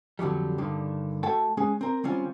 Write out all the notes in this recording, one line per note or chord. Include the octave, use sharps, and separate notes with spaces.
F2 D3 F#3 G3
G2 D3 D#3
A3 F#4 A4 C#5 G5 A5
G#3 C#4 G#4
C4 A#4
D#3 G3 C4 C#4 F4